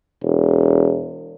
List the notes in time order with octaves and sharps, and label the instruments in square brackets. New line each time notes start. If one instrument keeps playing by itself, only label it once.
[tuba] E1